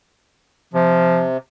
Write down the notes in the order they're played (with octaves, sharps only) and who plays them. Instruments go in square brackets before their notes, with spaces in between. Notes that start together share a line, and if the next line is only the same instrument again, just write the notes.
[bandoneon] C3 [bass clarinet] F3